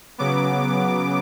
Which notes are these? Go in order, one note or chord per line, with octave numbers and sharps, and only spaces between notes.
C#3 F#3 B3 D6